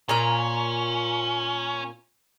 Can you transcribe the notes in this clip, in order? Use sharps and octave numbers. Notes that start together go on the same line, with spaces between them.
A#2 C#4 A#5